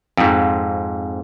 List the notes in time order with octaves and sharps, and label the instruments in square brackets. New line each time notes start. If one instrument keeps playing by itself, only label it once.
[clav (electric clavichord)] F2 G#2